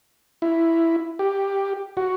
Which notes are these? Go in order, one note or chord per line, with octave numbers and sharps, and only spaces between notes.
E4
G4
F#4